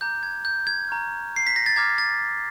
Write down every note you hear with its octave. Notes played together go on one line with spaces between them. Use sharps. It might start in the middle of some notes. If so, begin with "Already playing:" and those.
A#5 D6 F#6 G6
G#6
G6
G#6
A#5 C#6 F6
C7
B6
A#6
A6
A#5 D6 F6 G#6
A6